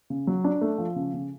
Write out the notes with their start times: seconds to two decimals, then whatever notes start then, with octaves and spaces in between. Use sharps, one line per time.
0.10 C#3
0.27 F#3
0.44 D4
0.61 A3
0.78 F3
0.96 C#3
1.14 C#3